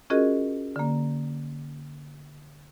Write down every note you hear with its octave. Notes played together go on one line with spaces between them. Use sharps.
C#4 F4 F#4 G#4 A#4 D#5
D3 A#3